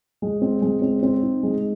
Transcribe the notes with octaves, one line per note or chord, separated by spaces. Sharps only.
G#3
C4
G#3
C4
C4
D#4
G#3